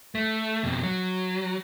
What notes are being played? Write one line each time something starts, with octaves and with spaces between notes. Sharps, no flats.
A3
F2 B2
F#3